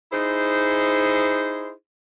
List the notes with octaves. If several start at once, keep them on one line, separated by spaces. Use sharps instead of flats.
D#4 E4 G#4 C5